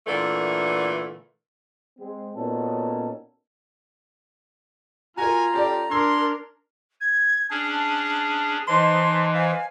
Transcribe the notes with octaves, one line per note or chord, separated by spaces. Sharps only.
A#2 D3 E3 A3
G#3 C4
A#2 B3 C#4 D#4 F#4 A4
F4 F#4 A#4 G#5 A#5
C#4 G4 A4 D5
D4 A#4 C6 E6 G#6
G#6
C#4 D4 G#4 A5
E3 D#4 C5 D#5 A5 C6
F5 G#5